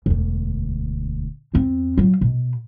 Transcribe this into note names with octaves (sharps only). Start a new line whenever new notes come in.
E1 D2
E2 C4
F#3 F4
B2